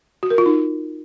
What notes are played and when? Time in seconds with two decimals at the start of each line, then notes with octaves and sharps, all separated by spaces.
0.23 F#4
0.30 A#4
0.38 F4
0.46 D#4